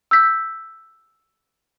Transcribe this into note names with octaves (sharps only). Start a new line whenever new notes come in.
E6 G6 B6